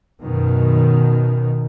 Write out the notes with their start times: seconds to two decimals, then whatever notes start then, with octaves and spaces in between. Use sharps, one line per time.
0.21 F#2 B2 D#3